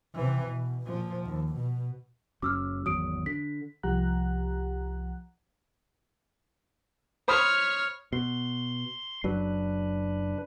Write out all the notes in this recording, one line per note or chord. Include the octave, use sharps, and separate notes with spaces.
C3 E3
B2
A#2 F3
D#2
B2
F#1 F#3 C#4 D6 E6 F6
G#1 E2 F#3 D#6 D7
D3 B6
C2 F3 G4 F#5 A#5 F#6
C5 C#5 B5 D#6 F6
B2 C6
F#1 F#3 D4 B4